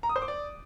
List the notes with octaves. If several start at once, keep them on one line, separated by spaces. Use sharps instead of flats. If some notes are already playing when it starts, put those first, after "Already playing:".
A#5
D#6
C5
D6
D5